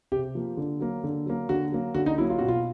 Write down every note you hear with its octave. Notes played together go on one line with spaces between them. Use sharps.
C3 G4
F3 A#3
D3
F#3 A#3
D3
F#3 A#3
D3 F#4
F#3 A#3
D3 F#4
D#4
F#3 A#3 E4
F4
B2 F#4
F4